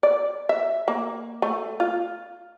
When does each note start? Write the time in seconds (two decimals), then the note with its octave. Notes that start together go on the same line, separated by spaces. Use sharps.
0.03 D5
0.49 E5
0.88 A#3
1.42 A3
1.80 F4